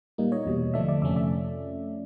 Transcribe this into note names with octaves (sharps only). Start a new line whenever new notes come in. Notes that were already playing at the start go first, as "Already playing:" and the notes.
A#2 G3 A#3 D#4
C#5 D#5
E2 B2 G3
D3 F3 A3 D4 D5 E5
D5 E5
F2 C3 F3 A3 C#4 D5 E5
D5 E5